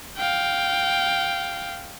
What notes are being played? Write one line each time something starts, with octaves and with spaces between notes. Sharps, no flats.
F5 G5